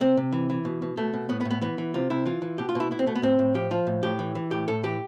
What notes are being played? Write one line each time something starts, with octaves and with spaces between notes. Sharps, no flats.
C3 C4
C3
E3
E3
B2
B2
B2 A3
B2
A2 B3
B3
A2
B3
E3 B3
E3
C3 F4
C3 E4
E3 F4
E3
B2 G4
F4
B2 E4
B2 E4
C4
B2 A3
B3
A2 C4
A2
F3 G4
F3 F4
A2
A2 G4
E3
E3
A2 G4
A2 A4
E3 G4